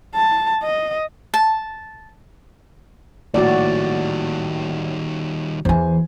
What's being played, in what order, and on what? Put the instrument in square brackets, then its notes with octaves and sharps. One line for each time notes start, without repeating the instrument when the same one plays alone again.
[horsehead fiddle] A5
D#5
[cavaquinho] A5
[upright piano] A#1 A2 F#5 [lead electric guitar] D#3 G3 [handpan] F#4 D5
[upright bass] E2 E3 [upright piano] C5 G#5